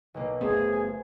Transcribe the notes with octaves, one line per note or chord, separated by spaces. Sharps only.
B1 B2 A#3
F#1 A3 B3 G#4 C5
G#5